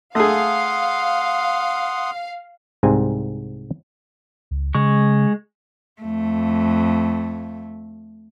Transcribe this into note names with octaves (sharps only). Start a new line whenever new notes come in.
A3 G#4 F5 F#5 C6 D#6
C2 G#2 C3 C4 G#5
C#2
C#3 G#3 C#6
F2 A3